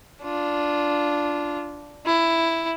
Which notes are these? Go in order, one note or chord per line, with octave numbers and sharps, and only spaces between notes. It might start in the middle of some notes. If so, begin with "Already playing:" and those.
D4 F4
E4